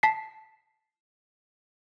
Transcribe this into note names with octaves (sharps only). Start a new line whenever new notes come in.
A5 B6 C7